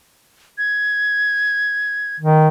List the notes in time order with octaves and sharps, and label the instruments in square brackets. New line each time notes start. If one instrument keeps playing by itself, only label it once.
[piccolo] G#6
[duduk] D#3